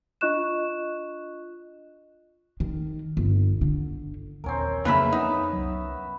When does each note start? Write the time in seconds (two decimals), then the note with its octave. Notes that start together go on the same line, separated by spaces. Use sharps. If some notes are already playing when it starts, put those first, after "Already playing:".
0.21 D4 F4 D#5 C#6 F#6 E7
2.60 D#3
3.17 G1
3.61 D3
4.44 D#1 A#1 D#2 C4 C#4 A#4
4.85 F2 C#3 F#3 A#3 B4 E5 B5
5.12 B3 D#4
5.53 C2 F#3